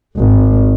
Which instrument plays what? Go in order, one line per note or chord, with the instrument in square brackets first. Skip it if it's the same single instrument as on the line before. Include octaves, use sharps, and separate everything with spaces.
[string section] G#1